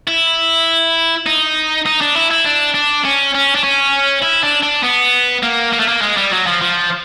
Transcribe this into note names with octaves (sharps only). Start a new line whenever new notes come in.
E4
D#4
D#4
D4
E4
E4
D4
D4
C#4
C#4
D4
C#4
E4
D4
D4
B3
A#3
A#3
A3
A#3
G#3
G3
F#3
F3
F3